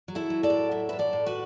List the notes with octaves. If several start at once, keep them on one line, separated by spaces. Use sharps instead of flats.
F#3
E4 A4
F#3
A4 D5
A2
F#3 E5
A2 B4 E5
A4 D5
A2
F#4 B4